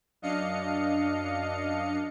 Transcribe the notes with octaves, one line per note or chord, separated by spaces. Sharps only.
F#2 D4 D#5 F5 C#7